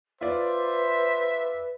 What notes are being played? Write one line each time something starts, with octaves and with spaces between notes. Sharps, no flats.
F4 B4 C5 D5 E5